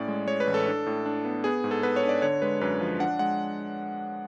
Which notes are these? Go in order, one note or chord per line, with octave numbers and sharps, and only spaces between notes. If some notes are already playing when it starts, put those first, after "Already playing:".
Already playing: A2 C#4 D5
G#3
G#3 C#5
B4
A1
A4
D4
A2
D4
B3
B3 G#4
G#2
A4
B3 B4
C#5
D4
D5
D3 C#5
G#3 B4
F#2 B4
F3
D4 F#5
G#3 F#5